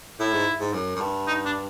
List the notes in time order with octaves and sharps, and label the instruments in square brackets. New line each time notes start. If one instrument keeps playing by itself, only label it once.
[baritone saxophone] A2 [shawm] E4
[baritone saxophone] G#2
G#2
F#2
F#2
G2
[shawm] D#4
D4